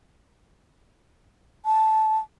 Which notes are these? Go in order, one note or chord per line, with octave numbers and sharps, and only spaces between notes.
A5